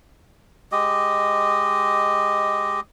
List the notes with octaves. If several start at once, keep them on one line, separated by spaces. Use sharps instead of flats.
G#3 G4 D#5